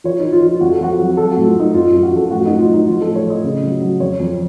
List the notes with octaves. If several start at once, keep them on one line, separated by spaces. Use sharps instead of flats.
F3 C#5
F3 D#4
F4
F3 F4
F2 F#4
A4
F2 F#4
F#3
F#3 A4
F#4
A2
F4
A2 D#4
F#2 F4
F#2 F4
F#4
F3 A4
A2 F#4
A2 D#4
F4
F#3 D#4
F3 F4
A4
A2
C#5
F3 D#5
C#3
F#3
F#3
F2 C#5
F2